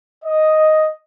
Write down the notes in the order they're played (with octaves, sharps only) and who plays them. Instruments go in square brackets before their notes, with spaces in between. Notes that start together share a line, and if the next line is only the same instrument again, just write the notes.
[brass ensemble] D#5